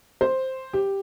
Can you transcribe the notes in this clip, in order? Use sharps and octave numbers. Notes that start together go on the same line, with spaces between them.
C5
G4